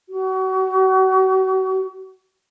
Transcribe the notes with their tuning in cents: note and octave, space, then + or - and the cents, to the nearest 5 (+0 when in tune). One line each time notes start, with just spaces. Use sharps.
F#4 +35